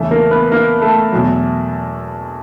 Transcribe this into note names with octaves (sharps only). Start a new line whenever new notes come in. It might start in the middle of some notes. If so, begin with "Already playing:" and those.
Already playing: E2 C#3 E3 A3 A4
A#3 A#4
B3 B4
A#3 A#4
A3 A4
E2 B2 F#3